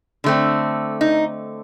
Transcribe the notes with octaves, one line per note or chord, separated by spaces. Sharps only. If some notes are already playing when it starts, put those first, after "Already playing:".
D3 A3 C4
D#4